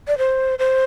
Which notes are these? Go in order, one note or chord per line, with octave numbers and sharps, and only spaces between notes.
D5
C5
C5